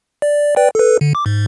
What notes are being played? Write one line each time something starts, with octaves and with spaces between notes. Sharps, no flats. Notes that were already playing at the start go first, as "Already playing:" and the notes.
D5
B4 D5 G5
A4 B4
D3
D6
G#2